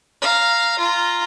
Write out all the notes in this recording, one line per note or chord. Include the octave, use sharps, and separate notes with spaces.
F5 A#5
F4 A#5